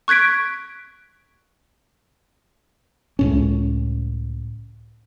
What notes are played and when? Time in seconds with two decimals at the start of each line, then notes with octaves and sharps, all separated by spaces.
0.08 C#6 F#6 G#6 B6 D7
3.19 C#2 A2 C#4